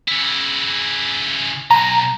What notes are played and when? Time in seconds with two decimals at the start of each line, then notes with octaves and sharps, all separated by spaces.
0.08 C#3 E4
1.71 B1 A#5